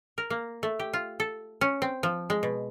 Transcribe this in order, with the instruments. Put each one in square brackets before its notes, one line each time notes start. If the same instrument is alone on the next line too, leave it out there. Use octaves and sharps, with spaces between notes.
[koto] A#4
A#3
A3
G4
F4
A4
C#4
C4
F3
G#3
B2